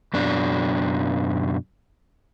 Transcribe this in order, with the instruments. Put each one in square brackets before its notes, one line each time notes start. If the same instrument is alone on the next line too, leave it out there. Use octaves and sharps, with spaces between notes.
[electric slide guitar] F#2 B2 D4